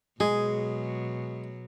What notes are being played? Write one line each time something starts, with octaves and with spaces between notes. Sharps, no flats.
B2 F#3 G#3 G#4